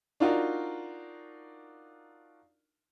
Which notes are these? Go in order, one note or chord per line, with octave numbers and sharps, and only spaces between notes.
D4 D#4 F4 F#4 A#4